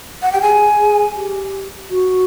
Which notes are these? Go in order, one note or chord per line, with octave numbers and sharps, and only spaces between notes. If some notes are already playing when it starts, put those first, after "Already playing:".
F#5
G4 G5
G#4 G#5
G#4
G4
F#4